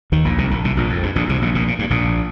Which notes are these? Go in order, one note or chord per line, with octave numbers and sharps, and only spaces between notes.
D#2 D#3
A#1 A#2
C2 C3
A#1 A#2
C2 C3
A#1 A#2
F2
G2
A#1 A#2
C2 C3
A#1 A#2
A#1 A#2
A#2
G2
A#1 A#2